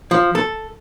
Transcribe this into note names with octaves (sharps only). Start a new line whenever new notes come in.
F3
A4